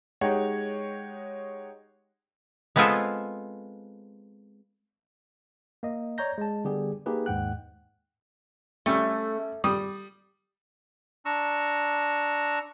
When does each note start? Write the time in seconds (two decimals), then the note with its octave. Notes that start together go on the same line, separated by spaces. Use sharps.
0.21 G#3 D#4 G4 C#5 F#5
2.76 G#3 B3 C4 F4 G#4 A4
5.83 A#3 D#5
6.18 C#5 D5 A#5 G6 A#6
6.38 G#3 A5
6.64 D3 G3 B3 G4 G#4
7.06 A#3 D#4 G4 G#4 B4
7.26 D#2 G#2 G#3 F#5 G5 F#6
8.86 G3 A3 C#4
9.64 G3 D#6
11.25 D4 A#5 C#6 E6